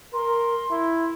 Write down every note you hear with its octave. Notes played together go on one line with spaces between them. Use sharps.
A#4 C6
E4